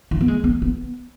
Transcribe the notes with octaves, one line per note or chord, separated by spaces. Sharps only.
E3
B3
G#3
B3
B3